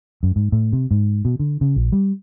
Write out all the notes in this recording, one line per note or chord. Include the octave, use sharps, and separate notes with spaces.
F#2
G#2
A2
C3
G#2
B2
D3
C#3
A#1
G3